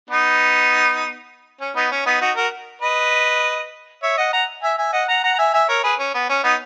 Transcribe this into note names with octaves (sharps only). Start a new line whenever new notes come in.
B3 D#4
C#4
B3 D#4
C#4
B3 D#4
D#4 F#4
F#4 A#4
B4 D#5
C#5 E5
D#5 F#5
F#5 A#5
E5 G#5
E5 G#5
D#5 F#5
F#5 A#5
F#5 A#5
A#5
E5 G#5
E5 G#5
A#4 C#5
G#4 B4
C#4
B3
C#4
B3 D#4